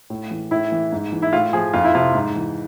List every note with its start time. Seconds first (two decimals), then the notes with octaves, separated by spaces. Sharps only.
0.10 A2
0.31 E3
0.51 A2 E4
0.72 E3
0.92 G#2
1.12 E3
1.22 E4
1.33 A2 F4
1.53 F3 G#4
1.73 F2 F4
1.84 E4
1.94 C3 F3 F4
2.15 G#2
2.36 E3